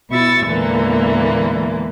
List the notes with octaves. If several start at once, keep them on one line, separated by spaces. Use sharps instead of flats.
B2 E4 C#6 E6 A6
E2 A#2 D3 E3 G#3 A#3